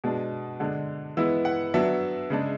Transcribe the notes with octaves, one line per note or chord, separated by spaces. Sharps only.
B2 G#3 D4
D3 G#3 D4
E3 G#3 B3 E4 E6
F#5
F#3 B3 D4 E5
C#3 G#3 D4